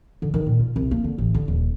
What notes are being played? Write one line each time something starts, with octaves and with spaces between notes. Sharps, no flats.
D3
D#3
A#2
F4
C2
A#3
D3
A1
D3
D#1